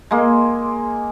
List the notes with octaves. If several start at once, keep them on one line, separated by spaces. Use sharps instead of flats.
G#3 A#3